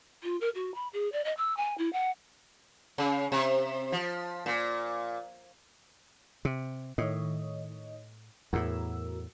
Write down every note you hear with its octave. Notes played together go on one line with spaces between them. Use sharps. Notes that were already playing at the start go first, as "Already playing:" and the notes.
F4
A#4
F#4
B5
G#4
D5
D#5
E6
G#5
E4
F#5
C#3
C3
F3
A#2
C3
A2 D#3 C#5 D#5
E2 A2 F#4 A#4 E6